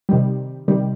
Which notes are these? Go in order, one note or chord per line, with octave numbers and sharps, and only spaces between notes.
C3 D#3 G3
C3 D#3 G3